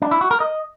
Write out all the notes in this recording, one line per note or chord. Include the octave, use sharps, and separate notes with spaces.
D4
E4
F#4
A#4
D#5